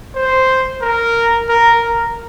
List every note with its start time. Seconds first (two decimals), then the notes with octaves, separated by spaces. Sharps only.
0.15 C5
0.82 A#4
1.49 A#4
1.82 A#4